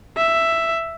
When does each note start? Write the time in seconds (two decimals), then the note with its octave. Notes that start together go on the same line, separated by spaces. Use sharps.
0.18 E5